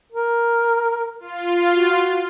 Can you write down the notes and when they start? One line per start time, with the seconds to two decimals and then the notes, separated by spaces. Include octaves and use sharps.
0.12 A#4
1.20 F4
1.69 F#4